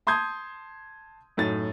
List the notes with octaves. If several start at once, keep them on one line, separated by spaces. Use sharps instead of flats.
A5 C6 D#6 G6 G#6
F#2 A2 D#4 A6